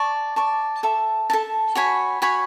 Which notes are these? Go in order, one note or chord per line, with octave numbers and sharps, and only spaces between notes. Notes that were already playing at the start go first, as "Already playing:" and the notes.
Already playing: D5 A5 C#6
D5 A5 C#6
A4 E5 A5
A4 E5 A5
F#4 C#5 G#5 B5
F#4 C#5 G#5 B5